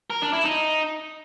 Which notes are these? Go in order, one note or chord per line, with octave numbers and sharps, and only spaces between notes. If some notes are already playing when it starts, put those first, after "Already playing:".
A#4
D4
E4
D#4